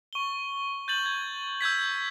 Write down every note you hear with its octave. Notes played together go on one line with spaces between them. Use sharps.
C#6 G7
G6 A6 F#7
G#6
E6 G6 G#6 B6